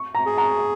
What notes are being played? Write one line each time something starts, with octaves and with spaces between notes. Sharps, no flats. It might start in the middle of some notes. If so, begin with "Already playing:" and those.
Already playing: C#6
A#5
G#4
A#5